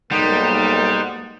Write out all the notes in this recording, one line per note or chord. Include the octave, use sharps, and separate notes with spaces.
B1 G#2 G3 A#3 D#4 F#5 C6